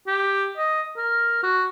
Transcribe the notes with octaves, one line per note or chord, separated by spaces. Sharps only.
G4
D#5
A#4
F#4